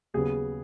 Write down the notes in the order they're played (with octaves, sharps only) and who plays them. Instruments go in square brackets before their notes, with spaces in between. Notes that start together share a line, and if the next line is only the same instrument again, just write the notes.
[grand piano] D#2 C#3 F#3 B3 [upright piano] G#4